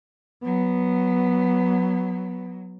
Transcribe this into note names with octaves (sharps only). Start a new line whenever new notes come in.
F#3 B3